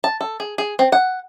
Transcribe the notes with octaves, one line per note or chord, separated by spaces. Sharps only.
A5
A4
G#4
G#4
C4
F#5